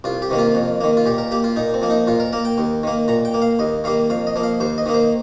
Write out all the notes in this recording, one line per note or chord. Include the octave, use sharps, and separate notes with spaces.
C2 F4
G4
C3 D#3 A#3
F4
F2
D#3 A#3
F4
A#2 G4
A#4
A#3 G4
F4
A#2 D#4
C4
F3 A#3
D#4
A#2 F4
A#4
A#3 A#4
G5
D#2
D#3 A#3
A#2 A#5
G5
A#3
F5
D#2 D#5
D#3 G3 A#3 F5
F2 F5
D#5
F3 A#3
F5
D#2 C5
D#5
D#3 A#3
C5